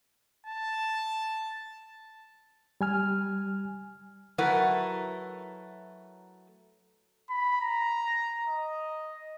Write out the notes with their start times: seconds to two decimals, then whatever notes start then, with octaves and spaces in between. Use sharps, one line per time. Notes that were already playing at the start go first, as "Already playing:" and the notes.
0.46 A5
2.81 G3 G#5 F6
4.38 F#3 A3 E4 A#4 B4 F#5
7.30 B5
7.61 A#5
8.47 D#5